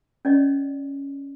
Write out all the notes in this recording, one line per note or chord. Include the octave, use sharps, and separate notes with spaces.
C#4 D5 D#5